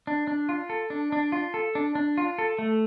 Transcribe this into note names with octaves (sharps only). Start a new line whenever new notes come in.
D4
D4
F4
A4
D4
D4
F4
A4
D4
D4
F4
A4
A3